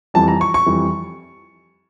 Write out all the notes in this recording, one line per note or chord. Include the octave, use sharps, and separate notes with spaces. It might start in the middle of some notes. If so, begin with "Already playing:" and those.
F2 E3 G3 A5
A#5
C#6
C#6
F2 E3 G3